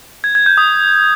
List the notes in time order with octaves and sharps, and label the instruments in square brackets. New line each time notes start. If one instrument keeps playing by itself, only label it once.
[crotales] G#6
G#6
G6
D#6